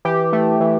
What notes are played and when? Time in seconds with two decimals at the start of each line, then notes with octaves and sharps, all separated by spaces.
0.05 E3 G4
0.33 A3
0.60 E3